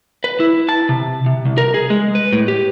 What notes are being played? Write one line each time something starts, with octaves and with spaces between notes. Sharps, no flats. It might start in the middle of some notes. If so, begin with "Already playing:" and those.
B4
E4
A5
C3
C3
C2
A#4
G#4
G#3
B4
A2
G4